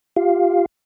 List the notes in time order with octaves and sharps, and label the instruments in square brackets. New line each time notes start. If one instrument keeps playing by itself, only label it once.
[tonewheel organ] F4 G4 F5